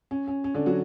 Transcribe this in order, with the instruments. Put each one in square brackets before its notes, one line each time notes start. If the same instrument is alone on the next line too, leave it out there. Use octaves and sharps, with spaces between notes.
[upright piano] C#4
C#4
C#4
D3 D4
F#3 F#4